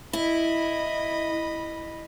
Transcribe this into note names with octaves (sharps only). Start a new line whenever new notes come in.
E4 D#5 B5